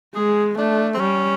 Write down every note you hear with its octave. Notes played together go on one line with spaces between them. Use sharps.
G#3 G#4
A3 D4
C4
G3 C#4